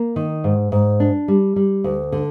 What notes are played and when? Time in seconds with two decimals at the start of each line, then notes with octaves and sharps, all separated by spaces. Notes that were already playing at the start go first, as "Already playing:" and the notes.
Already playing: A#3
0.16 D#3
0.44 G#2
0.72 G#2
1.00 D4
1.28 G3
1.56 G3
1.84 D2
2.12 D3